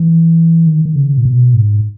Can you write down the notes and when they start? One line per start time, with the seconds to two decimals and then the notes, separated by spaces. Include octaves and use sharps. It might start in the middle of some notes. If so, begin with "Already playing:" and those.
Already playing: E3
0.67 D#3
0.85 D#3
0.96 C#3
1.18 A#2
1.25 B2
1.54 G#2